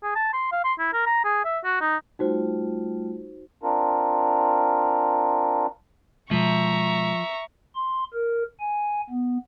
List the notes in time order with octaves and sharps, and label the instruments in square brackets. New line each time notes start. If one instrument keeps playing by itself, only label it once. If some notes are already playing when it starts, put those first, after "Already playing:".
[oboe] G#4
A5
C6
F5
C6
E4
A#4
A#5
G#4
E5
F#4
D#4
[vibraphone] G3 A3 F4 [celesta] D#4 F#4 C5
[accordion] C4 D4 F4 A#4
[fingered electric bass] B2 G#3 [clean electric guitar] F3 [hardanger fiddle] E5 [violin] A#5 C#6
[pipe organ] C6
A#4
G#5
B3